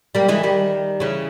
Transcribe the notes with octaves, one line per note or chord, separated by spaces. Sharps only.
G3 A#3
E3 G#3
D#3 G3
C#3 E3